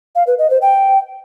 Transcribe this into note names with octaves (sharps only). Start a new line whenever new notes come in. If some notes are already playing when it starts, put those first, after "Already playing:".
F5
B4
D#5
C5
G5